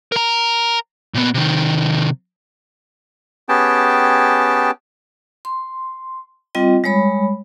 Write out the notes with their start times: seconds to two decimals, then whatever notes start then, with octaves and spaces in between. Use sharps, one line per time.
0.12 A#4 A#5
1.14 A#2 B3
1.34 C3 D#3
3.49 B3 C#4 G4 G#4 G5 A5
5.45 C6
6.55 G3 C4 F4 D#5 G5
6.84 G3 G#3 C#5 B5